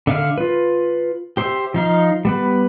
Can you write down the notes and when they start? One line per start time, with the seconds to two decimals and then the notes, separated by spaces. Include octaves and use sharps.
0.07 D3 E5 F5 F6
0.38 F4 B4
1.37 G4 C5 E5
1.74 F3 D#4 F5
2.25 G3 B3 B4